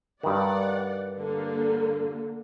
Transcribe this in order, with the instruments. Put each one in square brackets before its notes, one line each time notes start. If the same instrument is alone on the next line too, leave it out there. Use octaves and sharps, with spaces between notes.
[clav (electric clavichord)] G2 D#3 [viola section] D5 F#5
[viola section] D3 A#3